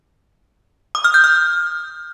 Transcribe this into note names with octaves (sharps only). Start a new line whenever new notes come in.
D#6
F6
G6
F6